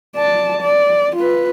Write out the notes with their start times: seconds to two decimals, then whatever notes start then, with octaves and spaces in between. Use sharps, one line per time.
0.16 D5 A5
0.61 D5
1.16 F4 B4